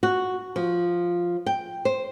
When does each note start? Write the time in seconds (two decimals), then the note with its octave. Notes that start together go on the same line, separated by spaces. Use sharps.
0.03 F#4
0.56 F3
1.46 G5
1.85 C5